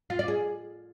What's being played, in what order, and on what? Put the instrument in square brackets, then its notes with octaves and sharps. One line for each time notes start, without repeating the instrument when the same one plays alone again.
[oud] F4
D5
G#4